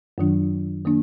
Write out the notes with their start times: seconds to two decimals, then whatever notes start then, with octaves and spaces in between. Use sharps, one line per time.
0.18 F#2 D#3 F#3 D4
0.85 D#3 A#3 D4